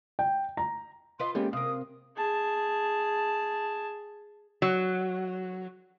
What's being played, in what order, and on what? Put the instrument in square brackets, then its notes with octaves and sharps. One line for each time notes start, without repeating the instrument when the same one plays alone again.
[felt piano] G5
A#5
[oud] F4 B4 D#5 [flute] C6
[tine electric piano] G#3 A#3 C#4 [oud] B3 A4 [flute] G4
[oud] C3 A#4 [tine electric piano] F5 [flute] D#6
[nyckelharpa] G#4 A5
[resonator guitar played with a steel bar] F#3